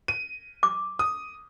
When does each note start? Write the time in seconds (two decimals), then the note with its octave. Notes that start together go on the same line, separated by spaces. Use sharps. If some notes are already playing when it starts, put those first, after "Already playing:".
0.08 D#7
0.63 D6
0.99 D#6